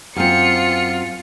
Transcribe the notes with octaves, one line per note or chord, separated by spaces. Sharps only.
F#2 C4 F4 C#7